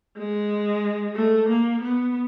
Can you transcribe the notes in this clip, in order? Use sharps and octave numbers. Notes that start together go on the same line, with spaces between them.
G#3
A3
A#3
B3